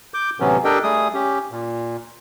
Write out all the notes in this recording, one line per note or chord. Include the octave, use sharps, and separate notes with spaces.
D6 G6
A2 C3 E3 F#3 B3 C#4
D4 G4 A4 A#4 D#5 G5
G3 A3 G#4 D#6
C#4 G4
A#2